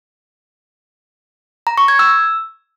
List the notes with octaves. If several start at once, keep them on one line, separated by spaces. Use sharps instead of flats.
A#5
C#6
G#6
E6